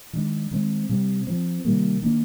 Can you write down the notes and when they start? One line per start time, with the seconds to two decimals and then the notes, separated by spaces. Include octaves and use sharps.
0.13 D#3 G#3 D4
0.51 D#3 G#3 C4
0.89 C3 G3 C4
1.27 F3 C4
1.65 C3 D#3 G3 A#3
2.02 D#3 A#3 D4